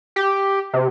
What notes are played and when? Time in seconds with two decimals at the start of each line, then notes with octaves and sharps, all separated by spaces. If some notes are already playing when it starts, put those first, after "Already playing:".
0.16 G4
0.73 C3